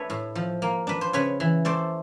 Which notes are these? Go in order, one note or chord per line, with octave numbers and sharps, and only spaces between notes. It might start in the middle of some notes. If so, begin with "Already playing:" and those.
Already playing: A3 D4 A4 B4 C#5
A2
F3
A#3
D4 B4
C5
C#3 B4 C#5
E3
A3 C5 D5